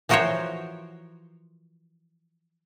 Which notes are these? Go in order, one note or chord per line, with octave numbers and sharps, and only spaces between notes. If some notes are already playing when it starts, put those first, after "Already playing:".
E3 F3 F#4 A#4 C5 C#5